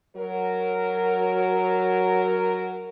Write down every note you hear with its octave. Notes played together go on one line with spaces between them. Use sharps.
F#3 A#4